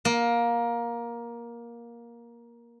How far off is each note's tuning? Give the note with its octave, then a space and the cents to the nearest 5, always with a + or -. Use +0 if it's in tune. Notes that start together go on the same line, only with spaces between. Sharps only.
A#3 +15